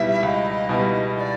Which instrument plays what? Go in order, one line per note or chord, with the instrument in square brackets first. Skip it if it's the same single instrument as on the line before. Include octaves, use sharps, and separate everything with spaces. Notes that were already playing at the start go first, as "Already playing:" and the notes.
Already playing: [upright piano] C#2 B2 G3 B3 E4 [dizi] E5
[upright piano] C#2 [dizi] E5
[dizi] D#5
[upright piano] B2 G3 B3 E4
[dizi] D#5
D5